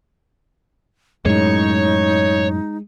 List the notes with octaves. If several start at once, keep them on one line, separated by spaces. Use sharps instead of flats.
F#2 A2 G#3 D#4 C#5